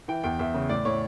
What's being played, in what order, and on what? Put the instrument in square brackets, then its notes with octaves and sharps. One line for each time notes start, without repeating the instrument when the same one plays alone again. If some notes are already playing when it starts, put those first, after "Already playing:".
[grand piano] E3 G5
E2 G5
E2 E5
C#3
A2 D5
A2 C#5